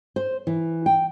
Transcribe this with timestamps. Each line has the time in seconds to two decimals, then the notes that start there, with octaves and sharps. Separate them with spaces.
0.16 C5
0.47 E3
0.86 G5